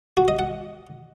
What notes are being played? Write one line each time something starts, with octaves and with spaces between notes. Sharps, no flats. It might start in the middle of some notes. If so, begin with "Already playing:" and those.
F#4
D#5
F#5